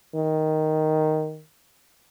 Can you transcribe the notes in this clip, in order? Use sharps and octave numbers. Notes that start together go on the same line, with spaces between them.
D#3